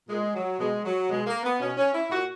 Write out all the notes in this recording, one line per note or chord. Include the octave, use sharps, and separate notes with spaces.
A#2 G#3
F#3
B2 G#3
F#3
B2 G#3
A#3
B3
B2 C#4
C#4
E4
A#2 F#4